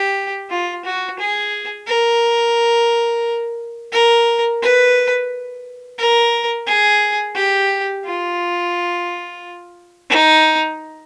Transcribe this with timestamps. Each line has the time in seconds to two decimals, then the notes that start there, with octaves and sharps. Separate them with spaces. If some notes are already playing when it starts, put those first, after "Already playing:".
Already playing: G4
0.50 F4
0.85 F#4
1.19 G#4
1.87 A#4
3.93 A#4
4.62 B4
5.98 A#4
6.67 G#4
7.35 G4
8.05 F4
10.10 D#4